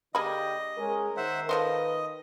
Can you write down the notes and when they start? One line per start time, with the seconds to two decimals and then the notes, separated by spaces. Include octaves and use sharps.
0.15 D3 A#3 G4 G#4 D#5 B5
0.78 G#3 C#4 A#4
1.17 D#3 C5 E5 F#5
1.49 F3 A3 B4 C5 D#5